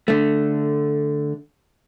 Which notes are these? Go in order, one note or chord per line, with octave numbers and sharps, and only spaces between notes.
D3 A3